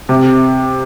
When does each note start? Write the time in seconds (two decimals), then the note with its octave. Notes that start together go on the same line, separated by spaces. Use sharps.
0.09 C3